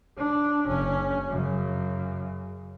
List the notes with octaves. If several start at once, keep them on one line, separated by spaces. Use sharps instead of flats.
D4
F#1 C#4
F#2 C#3